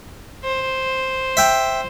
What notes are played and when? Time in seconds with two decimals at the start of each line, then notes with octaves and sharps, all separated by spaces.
0.44 C5
1.37 E5 G5